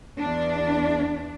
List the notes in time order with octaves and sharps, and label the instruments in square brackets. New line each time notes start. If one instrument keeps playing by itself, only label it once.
[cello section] E2 D4